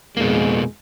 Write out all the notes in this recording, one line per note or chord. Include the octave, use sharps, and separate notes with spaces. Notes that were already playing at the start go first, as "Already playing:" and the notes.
F2 B2 D#3 G#3 A#3